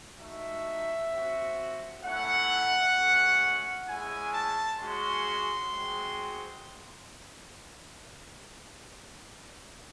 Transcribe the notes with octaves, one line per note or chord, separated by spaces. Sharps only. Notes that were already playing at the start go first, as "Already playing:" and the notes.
A3 D#4 F#4 E5
C4 F#4
A3 C#4 E4 F#5
A3 C#4 F#4
G#3 C#4 E4 G#5
A5
G#3 C#4 F#4 C6
G#3 C4 F#4